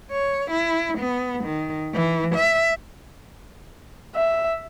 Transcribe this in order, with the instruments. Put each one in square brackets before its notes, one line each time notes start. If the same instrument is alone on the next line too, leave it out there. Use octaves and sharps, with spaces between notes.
[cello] C#5
E4
B3
D#3
E3
E5
[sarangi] E5